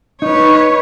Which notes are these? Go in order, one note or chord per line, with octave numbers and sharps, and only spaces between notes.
D#4 B4 C#5